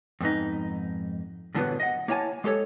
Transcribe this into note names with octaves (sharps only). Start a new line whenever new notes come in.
F2 G#2 B3 D#4
G2 A#2 D3 E3 F#3 B3
D#5 F#5
A#3 E4 C#5 F#5 G#5 A5
G#3 G4 A4 C#5